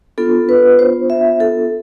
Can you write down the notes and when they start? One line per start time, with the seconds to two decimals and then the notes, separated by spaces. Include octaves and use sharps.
0.18 B3 D4 F4 A4
0.49 B4
0.79 C5
1.10 E5
1.40 A4